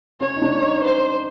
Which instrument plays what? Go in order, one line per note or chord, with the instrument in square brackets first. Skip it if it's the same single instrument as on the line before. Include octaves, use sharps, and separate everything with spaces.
[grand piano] C#4 [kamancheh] C#5
[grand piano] D#4
D4
D#4
[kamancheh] C5